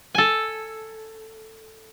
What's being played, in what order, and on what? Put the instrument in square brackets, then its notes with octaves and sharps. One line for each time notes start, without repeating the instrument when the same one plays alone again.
[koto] A4 G#5